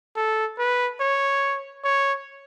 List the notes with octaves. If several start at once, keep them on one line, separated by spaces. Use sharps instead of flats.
A4
B4
C#5
C#5